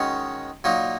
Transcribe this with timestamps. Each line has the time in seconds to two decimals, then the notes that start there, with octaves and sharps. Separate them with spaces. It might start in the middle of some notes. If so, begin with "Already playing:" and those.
Already playing: D#3 G#3 C#4 F#4
0.64 A#2 F#3 A#3 D#4